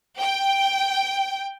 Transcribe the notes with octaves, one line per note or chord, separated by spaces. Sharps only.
G5